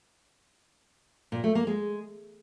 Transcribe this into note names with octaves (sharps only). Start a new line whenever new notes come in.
A#2
A3
A#3
G#3